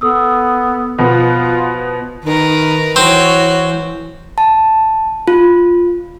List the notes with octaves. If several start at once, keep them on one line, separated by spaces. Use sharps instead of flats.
B3 A4 D#6 E6
B2 F3 B3 F4 B5
D#3 A#4 B4
E3 C4 F#4 C#5
A5
F4